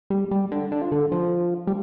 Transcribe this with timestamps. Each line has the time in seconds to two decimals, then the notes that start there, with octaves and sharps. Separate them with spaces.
0.10 G3
0.31 G3
0.52 D3
0.72 D3
0.82 F3
0.92 D3
1.12 F3
1.67 G3